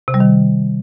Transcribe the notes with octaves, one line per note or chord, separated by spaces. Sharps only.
C3
G3
D#3